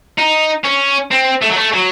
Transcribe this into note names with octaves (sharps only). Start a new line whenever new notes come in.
D#4
C#4
C4
A3
F#3
A3
F#3